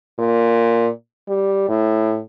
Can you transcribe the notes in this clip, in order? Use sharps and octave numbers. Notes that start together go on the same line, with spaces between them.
A#2
G3
A2